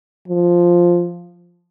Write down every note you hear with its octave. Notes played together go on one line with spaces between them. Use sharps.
F3